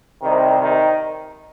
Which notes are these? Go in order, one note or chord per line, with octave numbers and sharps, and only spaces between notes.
C2 C3 D#3 G3 D#4
D#3 D#4